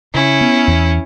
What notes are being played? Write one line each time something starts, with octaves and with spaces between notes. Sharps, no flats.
C#3 C#4 E4
B3
E2